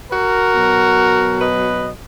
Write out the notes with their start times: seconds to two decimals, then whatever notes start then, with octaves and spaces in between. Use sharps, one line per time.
0.11 F#4 A#4
0.54 B2 F#3
1.41 B4 D#5